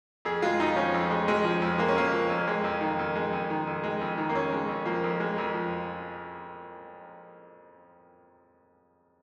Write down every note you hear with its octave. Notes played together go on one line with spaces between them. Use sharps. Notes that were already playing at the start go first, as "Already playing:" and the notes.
F2 G#4
G#3 F4
F2 D#4
F3 C#4
F2
G#3
F2 G#3
F3
F2
G#3 A#3
C#4
F2 A#3
F3
F2
G#3
F2
D#3
F2
G#3
F2
D#3
F2
G#3
F2
D#3
A#3
F2 C#4
G#3
F2
F3 A#3
F2
G#3
F2
F3